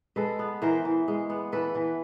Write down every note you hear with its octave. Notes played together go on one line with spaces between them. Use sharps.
G#3 A4 B4
B3
E3 A#4 C5
E3
G#3
B3
E3 A4 B4
E3